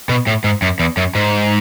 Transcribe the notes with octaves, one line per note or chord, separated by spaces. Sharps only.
B2
A2
G#2
F#2
E2
F#2
G#2